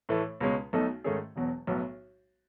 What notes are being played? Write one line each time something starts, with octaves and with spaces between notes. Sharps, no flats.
A2 E3 A3
C#2 B2 G#3 C#4
B1 B2 A3 D#4 A4
G#2 D#3 A3 C#4 G#4
E1 E2 B2 F#3
B1 A2 F#3 B3